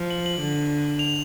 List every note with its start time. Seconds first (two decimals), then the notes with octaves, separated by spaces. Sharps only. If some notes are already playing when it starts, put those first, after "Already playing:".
Already playing: F3
0.10 F#7
0.26 F#7
0.41 D3
0.99 F7